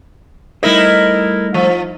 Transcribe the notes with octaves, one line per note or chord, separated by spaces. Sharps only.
G3 A3 D#4 E4 A#4 C5
F3